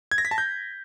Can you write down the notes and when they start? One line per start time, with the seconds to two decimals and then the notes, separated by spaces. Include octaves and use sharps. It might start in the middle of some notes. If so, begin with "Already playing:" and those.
0.11 G#6
0.18 A#6
0.25 B6
0.31 A5
0.38 G6